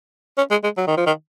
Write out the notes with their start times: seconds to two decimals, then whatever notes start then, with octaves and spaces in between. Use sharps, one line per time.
0.38 C#4
0.51 G#3
0.63 G#3
0.77 F#3
0.87 D#3
0.97 F3
1.06 D#3